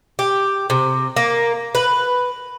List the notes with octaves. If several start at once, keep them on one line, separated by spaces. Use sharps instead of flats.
G4
C3
A#3
B4